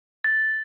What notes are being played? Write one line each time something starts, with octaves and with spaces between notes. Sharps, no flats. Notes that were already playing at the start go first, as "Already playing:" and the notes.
A6